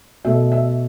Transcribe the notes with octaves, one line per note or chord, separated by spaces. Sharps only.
B2 A3 E5
E5